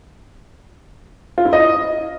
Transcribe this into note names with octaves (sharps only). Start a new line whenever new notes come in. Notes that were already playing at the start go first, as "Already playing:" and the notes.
F4
E4
D#5